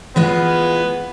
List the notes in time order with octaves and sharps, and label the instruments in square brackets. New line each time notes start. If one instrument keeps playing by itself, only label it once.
[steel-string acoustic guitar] E3 G#3 F4 [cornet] B3